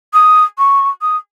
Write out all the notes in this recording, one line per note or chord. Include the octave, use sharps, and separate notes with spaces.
D#6
C#6
D#6